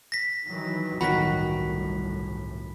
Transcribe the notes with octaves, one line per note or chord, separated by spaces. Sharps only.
A#6 B6
D#3 E3 F#3
G1 C2 A2 D#3 F#3 F#4 B5 B6